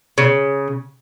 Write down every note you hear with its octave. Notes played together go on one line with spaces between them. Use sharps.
C#3